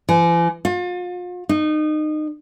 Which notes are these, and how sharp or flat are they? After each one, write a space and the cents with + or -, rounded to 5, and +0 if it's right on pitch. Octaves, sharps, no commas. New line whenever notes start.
E3 +45
F4 +35
D#4 -25